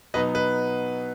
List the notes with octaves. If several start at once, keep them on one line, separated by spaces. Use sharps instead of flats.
B2 F#3 B3 D#4 B4 D#5
B4